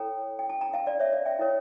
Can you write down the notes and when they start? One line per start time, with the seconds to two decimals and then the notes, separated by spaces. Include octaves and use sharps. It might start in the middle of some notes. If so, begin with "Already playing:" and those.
Already playing: E4 A4 C#5 G5 A#5
0.39 G5
0.50 A5
0.61 G5 A#5
0.74 F5 A5
0.86 D5 F5
0.99 C#5 E5
1.13 D5 F5
1.25 E5 G5
1.39 E4 A#4 C#5